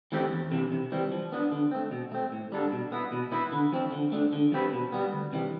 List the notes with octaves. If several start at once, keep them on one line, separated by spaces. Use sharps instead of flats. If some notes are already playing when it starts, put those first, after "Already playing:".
E3 A3 C4 G4
E2
C3 E3
C3
E3 G3 C4
F3
B3 D4
D3
A3 C4
B2
A3 C4
A2
G3 D4 A4
B2
B3 E4
B2
B3 E4 B4
D3
F3 C4
D3
A3 D4
D3
F3 C4 G4 B4
B2
G3 B3
D2
C3 E3 G3